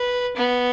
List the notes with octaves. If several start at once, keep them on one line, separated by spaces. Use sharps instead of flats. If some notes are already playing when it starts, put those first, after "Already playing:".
Already playing: B4
B3